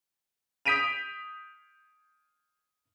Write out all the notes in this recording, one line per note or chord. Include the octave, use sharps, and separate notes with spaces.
D#6 G6 B6 D7 D#7 F7